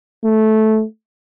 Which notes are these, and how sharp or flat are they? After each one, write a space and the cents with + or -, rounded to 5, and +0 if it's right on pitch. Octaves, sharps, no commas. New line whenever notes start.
A3 -10